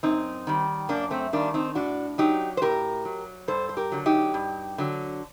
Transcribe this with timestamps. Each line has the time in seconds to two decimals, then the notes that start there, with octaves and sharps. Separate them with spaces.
0.03 F#2 C4 D#4
0.47 D#3 G3
0.89 F#2 A#3 D4
1.11 A3 C4
1.33 D#3 G3 A#3 D4
1.54 C4 D#4
1.75 A2 D4 F#4
2.18 F#3 D#4 G4
2.57 C5
2.62 A2 G4 A#4
3.05 F#3
3.48 G2 A4 C5
3.69 C5
3.77 G4 A#4
3.92 D3 F#3
4.06 D#4 G4
4.34 G2
4.78 D3 F#3